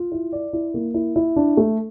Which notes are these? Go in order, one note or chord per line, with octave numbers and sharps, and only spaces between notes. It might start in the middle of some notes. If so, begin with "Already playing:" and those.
Already playing: F4
E4
D5
E4
A#3
E4
E4
D4
A3